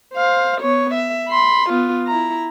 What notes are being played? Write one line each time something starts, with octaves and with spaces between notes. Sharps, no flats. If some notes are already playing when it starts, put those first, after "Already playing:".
C5 F5
B3 C#5
E5
B5 C6
B3 F4
E4 A#5